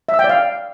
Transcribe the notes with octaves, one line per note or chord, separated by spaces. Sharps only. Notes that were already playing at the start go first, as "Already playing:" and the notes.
E5
E6
G5
D5
F5